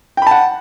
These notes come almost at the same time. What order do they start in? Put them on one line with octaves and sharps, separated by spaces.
G5 B5 A5 F#5